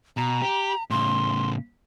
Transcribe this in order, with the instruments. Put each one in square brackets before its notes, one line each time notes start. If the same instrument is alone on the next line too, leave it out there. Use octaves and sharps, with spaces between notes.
[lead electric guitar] B2 [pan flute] A#5
[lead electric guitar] G4
[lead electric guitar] A2 C#3 [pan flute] C6